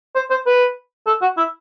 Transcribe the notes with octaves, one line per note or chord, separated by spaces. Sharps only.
C5
C5
B4
A4
F#4
E4